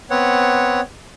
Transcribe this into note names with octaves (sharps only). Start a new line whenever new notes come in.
B3 C4 C#5 F#5